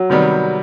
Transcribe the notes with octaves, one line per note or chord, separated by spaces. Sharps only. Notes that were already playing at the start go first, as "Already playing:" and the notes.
Already playing: F#3
C3 D#3 G3 B3